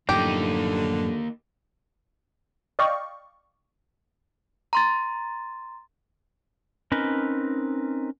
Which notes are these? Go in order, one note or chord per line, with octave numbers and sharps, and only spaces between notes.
F#2 A2 D3 F3 A#3 D#4 G4
D5 D#5 F5 G5 C#6
A#5 C6 A6
C4 C#4 D#4 A#4 B4